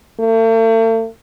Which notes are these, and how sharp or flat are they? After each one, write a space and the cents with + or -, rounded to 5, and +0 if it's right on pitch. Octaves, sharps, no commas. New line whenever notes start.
A3 +45